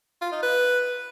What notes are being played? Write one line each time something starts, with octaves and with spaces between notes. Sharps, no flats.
F4
D#4
B4